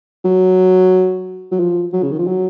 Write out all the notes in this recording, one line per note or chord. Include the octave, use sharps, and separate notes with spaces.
F#3
F#3
F3
F#3
C#3
D#3
F3
F#3